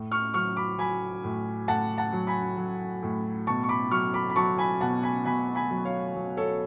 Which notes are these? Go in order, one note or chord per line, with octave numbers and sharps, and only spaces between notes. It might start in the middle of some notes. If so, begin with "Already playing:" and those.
Already playing: A2
C#6 F6
F#3 C#6 F6
B5 D6
F#3 G#5 B5
A2
A2 F#5 A5
F#5 A5
F#3
G#5 B5
F#3
A2
B2 A5 C#6
C#6
B5 D6
F#3 C#6 F6
B5 D6
B5
F#3 A5 C#6
G#5 B5
B2 F#5 A5
G#5 B5
B2 G#5 B5
G#5 B5
F#3
C#5 F5
F#3
A4 C#5